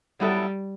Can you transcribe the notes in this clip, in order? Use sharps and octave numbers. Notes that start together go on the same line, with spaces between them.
F#3 G3 B3 E4 A4 E5